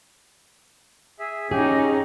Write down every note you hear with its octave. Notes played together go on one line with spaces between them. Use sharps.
G#4 E5
C#4 D#4 G4 G#4